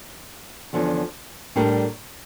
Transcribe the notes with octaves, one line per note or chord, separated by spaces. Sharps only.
E2 D3 F3 C#4
A2 G3 D4 G4 A#4